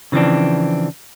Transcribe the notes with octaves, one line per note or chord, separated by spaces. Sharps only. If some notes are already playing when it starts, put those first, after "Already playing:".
C#3 E3 F3 C4 D4